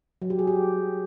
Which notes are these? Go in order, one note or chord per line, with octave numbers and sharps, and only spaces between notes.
F#3
G4
G#4
G4